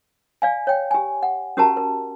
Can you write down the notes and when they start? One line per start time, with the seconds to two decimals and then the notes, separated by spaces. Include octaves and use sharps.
0.42 D5 F5 G#5
0.67 C#5 G5
0.91 G4 G#5
1.23 F#5
1.57 C#4 F#4 G4 A#4 A5 A#5
1.77 A#4